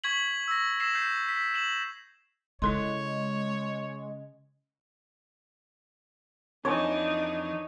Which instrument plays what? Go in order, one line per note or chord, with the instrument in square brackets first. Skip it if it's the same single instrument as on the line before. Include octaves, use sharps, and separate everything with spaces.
[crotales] C#6 G#6 B6 F#7
E6 A#6
E6 A#6 C7 E7 F#7
G6 C7
B6
E7 F#7
[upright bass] C#3 [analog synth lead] G#3 [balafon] E4 A4 C6 [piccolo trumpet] C#5
[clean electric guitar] F2 E3 [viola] D4 D#4 [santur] C#5 [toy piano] G#5 D6